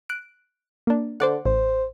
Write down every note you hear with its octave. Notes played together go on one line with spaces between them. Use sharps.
F#6 D7
A#3 D4
D3 C5 D5 F#5
A1 C5